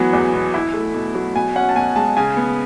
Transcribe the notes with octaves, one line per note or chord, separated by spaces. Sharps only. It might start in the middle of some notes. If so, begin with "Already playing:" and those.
Already playing: E3 F#3 B3
E2
B2
E4
A3
B2
F#3
B2 G#5
C#4 F#5
A5
B2 G#5
G#3 A5
C#3 G#5
B3